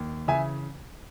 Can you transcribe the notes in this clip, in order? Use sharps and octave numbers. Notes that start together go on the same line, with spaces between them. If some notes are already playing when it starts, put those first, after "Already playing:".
Already playing: D#2
C#3 E3 E5 G#5